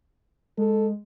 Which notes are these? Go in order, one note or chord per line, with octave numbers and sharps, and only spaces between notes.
G#3 A4